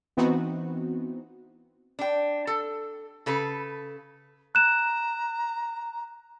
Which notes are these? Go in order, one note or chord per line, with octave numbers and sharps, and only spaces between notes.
E3 B3 C4 D#4 F#4
D4 G5
A4
C#3 A4 B4
A#5 F#6 E7